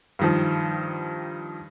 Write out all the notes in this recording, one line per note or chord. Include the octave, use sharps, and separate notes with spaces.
G2 D#3 F3